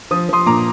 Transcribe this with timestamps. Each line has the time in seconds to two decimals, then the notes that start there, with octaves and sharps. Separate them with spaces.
0.11 F3 D#6
0.29 F3 C6 D#6
0.46 A#2 A#5 D6